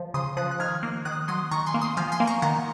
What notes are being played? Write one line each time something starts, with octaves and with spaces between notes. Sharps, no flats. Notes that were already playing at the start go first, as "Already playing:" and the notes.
Already playing: F3
C#3 C6 D#6
F3 D#6 F#6
F#6
D#3 F6 G#6
A#3
D#3 D#6 F#6
F#3 C6 D#6
D#3 A#5 C#6
G#5 C6
A#3
C6 D#6
F3 F5 G#5
G#5 C6
A#3
A#5 C#6
D#3 F#5 A#5